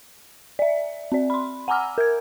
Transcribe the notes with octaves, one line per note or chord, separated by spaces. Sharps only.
D5 E5
C4 D5
B5 C6
F#5 G#5 A#5 D6 E6 F6
A#4 G#6